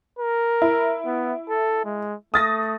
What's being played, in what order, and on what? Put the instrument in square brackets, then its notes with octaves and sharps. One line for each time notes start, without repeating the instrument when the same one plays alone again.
[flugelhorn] A#4
[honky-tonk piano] E4
[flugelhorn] B3
A4
G#3
[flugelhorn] A3 [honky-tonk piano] D#6 A6 A#6